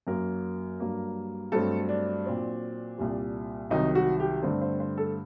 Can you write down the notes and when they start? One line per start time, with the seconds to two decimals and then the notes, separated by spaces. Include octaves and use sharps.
0.07 F#2 F#3 A#3 A#4
0.80 G2 F#3 A#3
1.52 G2 F#3 A3 C4 A4
1.89 D4
2.26 A#2 F#3 C4
2.98 C2 A#2 G3
3.71 C2 C3 D#3 F#3 D#4
3.95 F#4
4.20 G4
4.43 G2 D3 A3 C4 C5
4.61 C5
4.80 C5
4.98 A4